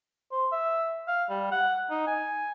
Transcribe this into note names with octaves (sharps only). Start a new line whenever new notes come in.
C5
E5
F5
G3
F#5
D#4
G#5